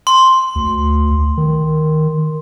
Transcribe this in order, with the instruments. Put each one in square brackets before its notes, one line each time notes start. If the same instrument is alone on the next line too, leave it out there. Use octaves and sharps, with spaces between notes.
[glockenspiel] C6
[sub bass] D2
D#3